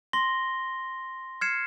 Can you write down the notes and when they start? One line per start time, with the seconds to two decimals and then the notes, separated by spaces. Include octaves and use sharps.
0.13 C6 A#6 G7
1.41 F6 G#6 C7 C#7 E7